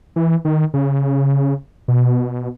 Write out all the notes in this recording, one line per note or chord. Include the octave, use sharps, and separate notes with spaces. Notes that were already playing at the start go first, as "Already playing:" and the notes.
E3
D#3
C#3
B2